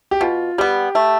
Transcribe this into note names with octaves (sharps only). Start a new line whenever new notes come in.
G4
B2 F4
G3 B3 G4
A3